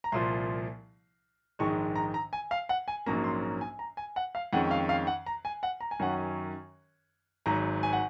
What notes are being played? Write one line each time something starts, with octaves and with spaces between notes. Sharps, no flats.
A#5
C2 A#2 F3 C6
A#1 G#2 D#3 G#3 C#6
A#5
A#5
G#5
F5
F#5
G#5
A#1 G#2 F#3 A#3 C#4 A#5
C6
A#5
G#5
A#5
G#5
F#5
F5
F2 D#3 G#3 C#4 F#5
F5
F5
F#5
A#5
G#5
F#5
A#5
G#5
F#2 D#3 F#3 C#4 F#5
G#5
G#1 G#2 F#3 A#5
G#5
F#5